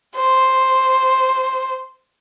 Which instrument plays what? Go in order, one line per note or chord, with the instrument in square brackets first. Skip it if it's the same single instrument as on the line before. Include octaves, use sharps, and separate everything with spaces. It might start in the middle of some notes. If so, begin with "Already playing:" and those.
[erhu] C5